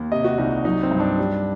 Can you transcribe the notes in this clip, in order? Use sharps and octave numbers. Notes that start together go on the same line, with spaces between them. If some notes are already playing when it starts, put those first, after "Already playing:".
Already playing: D#2
C3 D#5
F#4
C2 D#4
F#3 D#4
C4
G2
D4
G3